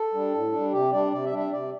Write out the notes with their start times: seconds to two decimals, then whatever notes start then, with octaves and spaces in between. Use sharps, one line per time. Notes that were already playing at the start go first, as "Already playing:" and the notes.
Already playing: A4
0.14 G3 D4
0.34 A2
0.53 G3 D4
0.73 C3 G4
0.92 G3 D4 D5
1.12 C3 D5
1.25 E5
1.32 G3 D4
1.38 E5
1.52 C3 D5